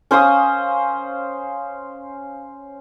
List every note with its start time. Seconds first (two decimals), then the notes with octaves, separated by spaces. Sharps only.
0.11 C#4 C5 F5 D#6